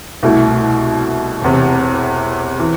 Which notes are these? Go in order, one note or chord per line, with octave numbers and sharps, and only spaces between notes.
C2 B2 A3 E4
E1 E2 C3
E3